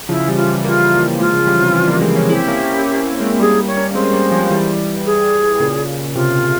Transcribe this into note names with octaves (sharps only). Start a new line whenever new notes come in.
C#3 F3 E4
F3
E3 G3
F4
E3 G3
G3 A#3 F4 G4
F3
G3
F3 G#3 F4
C#3 F3
E3 G3
C3
C3 E3
G3 A#3
G#3 C4
A#3 C#4
C4 E4 G4 G#4
A#3 C#4
C4
C#4
C4
C#4
G#3 C4
G3 A#3 G#4
C#5
A#3 C#4
G#3 C4 C5
G3 A#3
F3 G#3
E3 G3
G#4
A#2 C#3
C3 F4